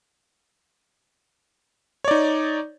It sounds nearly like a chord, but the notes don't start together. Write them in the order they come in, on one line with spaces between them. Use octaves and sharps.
C#5 D5 D#4